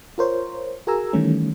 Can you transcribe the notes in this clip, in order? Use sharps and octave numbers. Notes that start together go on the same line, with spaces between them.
F4 A#4 C5 C#5
F#4 G#4 A#4 G#5 A#5 E6
D#3 E3 G3 A3 C#4